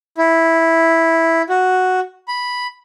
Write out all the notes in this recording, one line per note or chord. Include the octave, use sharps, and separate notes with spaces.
E4
F#4
B5